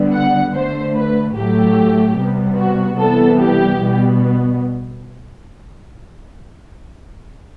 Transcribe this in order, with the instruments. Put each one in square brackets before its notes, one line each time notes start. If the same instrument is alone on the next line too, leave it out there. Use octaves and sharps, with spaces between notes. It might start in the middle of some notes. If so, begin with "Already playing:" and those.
Already playing: [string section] D3 G3 B3
F#5
D3 A3 C5
B4
A2 F#3 A3 G4
C3 G3 B3
F#4
C3 E3 G3 B3 A4
G4
B2 G3 B3